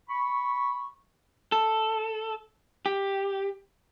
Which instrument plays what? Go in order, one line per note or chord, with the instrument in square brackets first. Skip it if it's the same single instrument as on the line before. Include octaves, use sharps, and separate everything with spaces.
[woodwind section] B5 C#6
[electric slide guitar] A4
G4